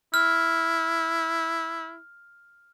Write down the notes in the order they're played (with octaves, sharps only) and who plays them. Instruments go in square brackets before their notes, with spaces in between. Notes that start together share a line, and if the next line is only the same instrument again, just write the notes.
[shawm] E4 [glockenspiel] F6